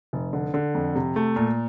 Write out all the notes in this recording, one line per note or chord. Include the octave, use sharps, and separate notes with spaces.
F1
D3
D3
F2
C3
A3
A#2